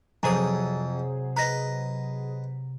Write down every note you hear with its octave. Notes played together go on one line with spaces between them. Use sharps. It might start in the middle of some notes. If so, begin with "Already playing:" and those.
F2 C3 F#3 G#4 C5 G#5 A#5 D#6
B4 D#5 A#5 A#6